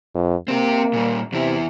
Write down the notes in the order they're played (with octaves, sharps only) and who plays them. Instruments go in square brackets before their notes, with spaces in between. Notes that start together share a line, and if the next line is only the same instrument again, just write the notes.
[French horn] F2
[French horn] A#3 [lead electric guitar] C4 G4
[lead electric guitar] A#2 G3
[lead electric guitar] E2 E4 [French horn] C3